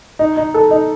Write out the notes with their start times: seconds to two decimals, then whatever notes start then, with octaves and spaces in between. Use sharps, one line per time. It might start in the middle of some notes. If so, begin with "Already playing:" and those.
0.19 D#4
0.37 D#4
0.54 A4
0.71 D#4